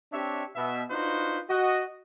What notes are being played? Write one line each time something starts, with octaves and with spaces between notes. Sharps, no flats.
C4 D4 G4 C#5 E5
B2 E5
D4 D#4 F4 F#4 B4 C5
F#4 D#5